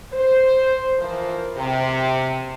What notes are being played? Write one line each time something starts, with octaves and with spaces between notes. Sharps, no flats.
C5
E3 F3 A#4 C5
C3